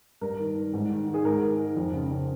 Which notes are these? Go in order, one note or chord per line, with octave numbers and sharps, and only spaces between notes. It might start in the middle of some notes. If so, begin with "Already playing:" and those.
G2 A#4
D#3
D#3
G#2
D#3
D#3
G#4
G#2 A#4
D#3
D#3
F2
C#3
C#3